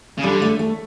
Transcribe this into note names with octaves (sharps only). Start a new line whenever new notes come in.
C#3
D3 G3
A3
A3